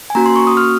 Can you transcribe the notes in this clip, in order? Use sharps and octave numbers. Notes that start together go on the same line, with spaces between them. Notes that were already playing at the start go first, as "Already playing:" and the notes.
G#5
A#3 C#4 F#4 A#5
C6
C#6
D#6
F6